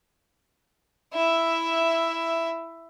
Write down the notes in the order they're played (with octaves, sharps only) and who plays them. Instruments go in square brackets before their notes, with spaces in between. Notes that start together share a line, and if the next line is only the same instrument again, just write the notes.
[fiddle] E4 E5